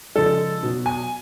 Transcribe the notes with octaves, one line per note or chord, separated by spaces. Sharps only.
C#3 F3 G#3 A4
B2 F#3
G#5